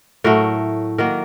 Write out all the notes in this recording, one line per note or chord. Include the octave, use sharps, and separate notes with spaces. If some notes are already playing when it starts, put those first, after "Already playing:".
A2 F#3 A3 A#4
D#3 F#3 A#3 A#4